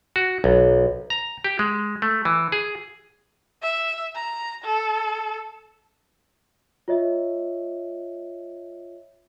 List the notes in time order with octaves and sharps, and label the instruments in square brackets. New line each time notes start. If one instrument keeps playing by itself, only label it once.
[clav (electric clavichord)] F#4
B1
A#5
G4
G#3
A3
E3
G#4
[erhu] E5
A#5
A4
[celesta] F4 C#5 D#5 E5